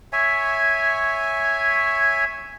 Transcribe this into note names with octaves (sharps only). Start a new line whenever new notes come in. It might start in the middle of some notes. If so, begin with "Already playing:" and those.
C#5 E5 G#5